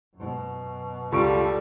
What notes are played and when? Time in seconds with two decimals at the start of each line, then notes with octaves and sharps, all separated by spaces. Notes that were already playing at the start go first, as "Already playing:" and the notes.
0.15 F#2 B2
1.12 C#2 G3 F4 A4 C#6 D7